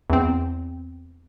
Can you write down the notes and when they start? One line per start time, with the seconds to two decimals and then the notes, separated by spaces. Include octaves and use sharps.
0.10 E2 C4